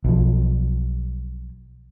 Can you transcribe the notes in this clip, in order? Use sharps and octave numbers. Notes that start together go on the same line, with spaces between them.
B1 F3